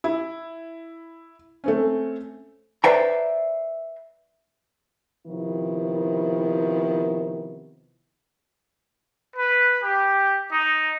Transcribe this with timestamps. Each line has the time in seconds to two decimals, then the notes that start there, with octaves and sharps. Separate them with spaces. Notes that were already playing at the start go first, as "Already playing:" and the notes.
0.04 E4
1.64 A3 C4 C#4
2.84 B4 C5 D5 E5 G5 A#5
5.26 C3 D#3 F3 B3 E4
9.35 B4
9.83 G4
10.52 D#4